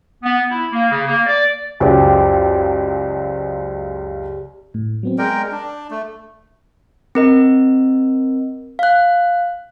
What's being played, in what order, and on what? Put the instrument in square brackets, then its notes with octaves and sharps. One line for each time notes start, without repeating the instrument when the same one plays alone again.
[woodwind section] B3
E4
A#3
C#3
A#3
D5
[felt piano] C#2 F#2 [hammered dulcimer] G4 C5 D5
[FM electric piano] A2
F#3 B3 C4
[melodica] G#3 A#4 G5 [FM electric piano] D5
[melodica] D4
A3
[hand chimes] C4 A#4 D#5
F5 F#6